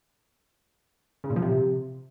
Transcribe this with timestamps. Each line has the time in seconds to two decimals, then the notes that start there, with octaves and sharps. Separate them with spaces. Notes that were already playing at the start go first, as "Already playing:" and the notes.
1.24 C#3
1.30 A#2
1.36 F3
1.42 C3